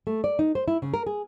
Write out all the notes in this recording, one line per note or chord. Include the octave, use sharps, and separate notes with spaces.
A3
D5
D#4
C5
E4
C#3
A#4
G#4